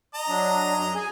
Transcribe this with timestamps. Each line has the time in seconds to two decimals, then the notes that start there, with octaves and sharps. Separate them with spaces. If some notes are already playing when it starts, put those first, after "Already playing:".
0.14 D#5 A#5
0.28 F#3 D4
0.76 F#2
0.95 G#4 G#5